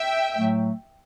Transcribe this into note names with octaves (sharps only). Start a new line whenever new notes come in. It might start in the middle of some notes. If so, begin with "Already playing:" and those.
Already playing: E5 G5
A2 F#3 A3